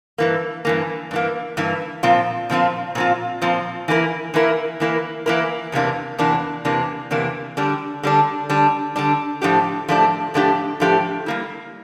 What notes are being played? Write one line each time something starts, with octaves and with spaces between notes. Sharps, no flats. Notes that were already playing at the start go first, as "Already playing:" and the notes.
G2 E3 A#3
G2 E3 A#3
G2 E3 A#3
G2 E3 A#3
A#2 F3 C4 F4
A#2 F3 C4 F4
A#2 F3 C4 F4
A#2 F3 C4 F4
E3 A#3 E4 A#4
E3 A#3 E4 A#4
E3 A#3 E4 A#4
E3 A#3 E4 A#4
E2 C3 E3 A#3 D4
E2 C3 E3 A#3 D4
E2 C3 E3 A#3 D4
E2 C3 E3 A#3 D4
D3 G3 D4
D3 G3 D4
D3 G3 D4
D3 G3 D4
A2 F3 A3 D4 G4
A2 F3 A3 D4 G4
A2 F3 A3 D4 G4
A2 F3 A3 D4 G4
G3 A#3 E4